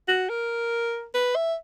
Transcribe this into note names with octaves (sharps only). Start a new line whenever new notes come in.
F#4
A#4
B4
E5